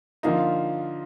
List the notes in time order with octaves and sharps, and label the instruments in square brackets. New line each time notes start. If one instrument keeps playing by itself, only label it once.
[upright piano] D3 F3 A#3 D#4 [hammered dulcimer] F4 F5